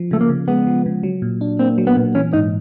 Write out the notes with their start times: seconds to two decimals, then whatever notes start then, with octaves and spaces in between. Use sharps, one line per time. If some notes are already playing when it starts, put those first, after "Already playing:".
Already playing: F3
0.11 C#3 A3
0.21 A#3
0.29 C#3
0.48 G#3 B3
0.67 F3
0.86 C#3
1.03 F#3
1.22 A#2
1.41 D4
1.59 A#3 C4
1.78 F#3
1.87 B3
1.96 A#2
2.15 E3 C#4
2.33 G#2 D#4